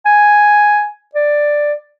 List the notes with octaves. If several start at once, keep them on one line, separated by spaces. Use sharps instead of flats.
G#5
D5